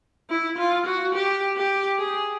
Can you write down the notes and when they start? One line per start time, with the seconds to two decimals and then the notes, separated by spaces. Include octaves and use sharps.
0.30 E4
0.58 F4
0.86 F#4
1.14 G4
1.56 G4
1.99 G#4